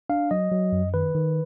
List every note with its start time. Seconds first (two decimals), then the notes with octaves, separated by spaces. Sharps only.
0.10 D4 F5
0.31 F#3 D#5
0.52 F#3
0.72 F#2
0.94 D#3 B4
1.15 D#3